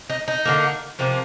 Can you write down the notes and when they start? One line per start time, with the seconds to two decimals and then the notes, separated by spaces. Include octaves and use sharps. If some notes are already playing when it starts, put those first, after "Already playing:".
0.10 D#4
0.28 D#4
0.45 D3 G3 A#3
0.99 C3 F3 A#3